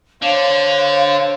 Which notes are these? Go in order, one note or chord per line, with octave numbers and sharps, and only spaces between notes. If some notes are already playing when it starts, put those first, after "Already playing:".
D3 C5 C#5 F5